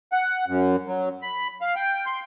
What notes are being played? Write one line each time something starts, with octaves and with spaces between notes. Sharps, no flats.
F#5
F#2
F#3
B5
F5
G5
C6